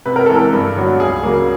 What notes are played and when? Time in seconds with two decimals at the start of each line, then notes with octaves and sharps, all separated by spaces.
0.06 C3 B4
0.16 A#4
0.26 E3 G#3 C4 A4
0.36 A#4
0.53 G2
0.76 D3 F#3 B3 D4
1.00 C#2 G#4
1.23 C#3 F#3 A#3